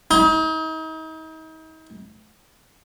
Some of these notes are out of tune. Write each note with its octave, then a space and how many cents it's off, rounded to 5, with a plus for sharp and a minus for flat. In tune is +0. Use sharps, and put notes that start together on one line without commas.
D#4 +40